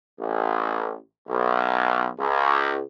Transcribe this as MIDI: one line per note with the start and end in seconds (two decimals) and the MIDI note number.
0.19 0.96 33
1.28 2.09 35
2.19 2.81 37